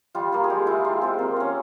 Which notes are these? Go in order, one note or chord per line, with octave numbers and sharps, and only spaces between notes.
G3 F4
A#3 F4
G#4
G#3 G4
E4 F4
G#3 G4
C4 F4
A#3
C#4 F4